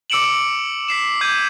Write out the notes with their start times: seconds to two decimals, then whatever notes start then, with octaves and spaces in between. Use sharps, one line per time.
0.10 D6 E6 C#7 D7 E7 F#7
0.88 B6 C7 E7
1.21 D6 G6 G#6 D#7